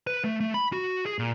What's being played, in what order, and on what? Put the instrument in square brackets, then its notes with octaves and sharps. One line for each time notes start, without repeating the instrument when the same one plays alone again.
[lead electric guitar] B4
A3
A3
B5
F#4
G#4
A#2